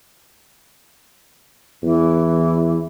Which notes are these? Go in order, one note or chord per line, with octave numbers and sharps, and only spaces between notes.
E2 E3